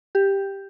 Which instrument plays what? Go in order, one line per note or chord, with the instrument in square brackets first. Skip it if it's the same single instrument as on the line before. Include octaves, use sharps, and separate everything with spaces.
[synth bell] G4